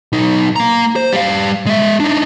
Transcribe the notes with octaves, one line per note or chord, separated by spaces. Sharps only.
B1 D#4
A#3 A#5
C5
G3 F5
G#3 E5
D4 D#4